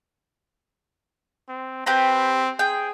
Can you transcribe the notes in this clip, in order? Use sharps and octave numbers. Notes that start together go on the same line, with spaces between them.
C4
C4 G4 B4 A#5
G#4 G5